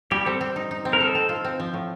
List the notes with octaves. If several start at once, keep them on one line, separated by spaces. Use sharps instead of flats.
G3 G4
C4 A4
C4
D#4
D#4
C4
A#4
D#4 A4
C4
F4
C4
F3
A2